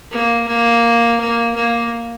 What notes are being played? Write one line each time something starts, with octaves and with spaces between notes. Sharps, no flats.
A#3
A#3
A#3
A#3